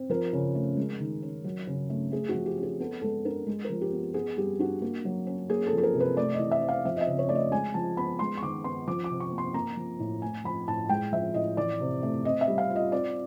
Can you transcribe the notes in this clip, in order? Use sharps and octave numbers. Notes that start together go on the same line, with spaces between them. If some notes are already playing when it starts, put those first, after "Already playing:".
Already playing: C4
F3 A#4
C#3
A3
G#3
D#3
C#4
F#3
C#3
A3
A3 G#4
F#4
F3
G4
C#4
G#4
B3 A4
G#3 A4
D4 A#4
G#3
A#4
F3
G4
B3
B3 G#4
G3 G4
D4 F#4
A#3
F#3
C#4
A#3 G#4
A4
F3
A4
A#4
C3
B4
A3 D5
D#5
E3
E5
C4
F5
F3 E5
D#5
E5
C#3
C#5
A3 D5
D#5
G#3 G#5
F3 A5
B3 B5
G#3 C6
C#6
D#3 D6
B3 C6
F3 D6
D6
C3
C#6
A#3
C6
A#3 A#5
F3
A2
A3 G#5
F3 B5
A2 A5
G#3 G5
F3 E5
A2 D#5
E3 D5
C3
A3
C4 D#5
E5
G3
F5
F4
D#5
C4 D5